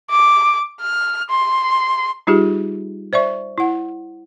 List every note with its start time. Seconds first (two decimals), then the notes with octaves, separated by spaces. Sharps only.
0.11 D6
0.81 F6
1.30 C6
2.27 G3 D#4 F4 G4 G#4
3.13 C5 D5 E5 C#6
3.58 E4 F#5